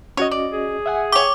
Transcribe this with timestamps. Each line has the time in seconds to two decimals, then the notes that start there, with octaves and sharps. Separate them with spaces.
0.17 C#4 F#4 C#5 D#5
0.31 D5
0.52 G#4
0.86 E5 F#5 G#5
1.12 G4 C#5 D6